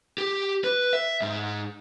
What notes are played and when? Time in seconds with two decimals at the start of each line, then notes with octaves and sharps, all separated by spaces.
0.18 G4
0.64 B4
0.93 E5
1.22 G#2